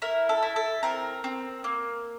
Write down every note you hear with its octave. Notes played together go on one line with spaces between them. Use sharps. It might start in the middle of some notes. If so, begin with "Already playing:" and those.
E4 A#4
A4
E4
A4
C4 A#4
C4
A#3